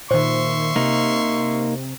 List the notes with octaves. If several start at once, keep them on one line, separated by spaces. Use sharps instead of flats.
A#2 D#3 C5 E5 C6 C#6
C3 A#3 D#4